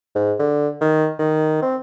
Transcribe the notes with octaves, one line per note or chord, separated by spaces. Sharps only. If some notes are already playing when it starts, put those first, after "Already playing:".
G#2
D3
D#3
D#3
C4